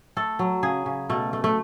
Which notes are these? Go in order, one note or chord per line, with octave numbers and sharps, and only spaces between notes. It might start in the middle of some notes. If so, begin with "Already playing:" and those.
A3 A4
F#3
C#3 G#4
C#3
B2 A3
A3
A3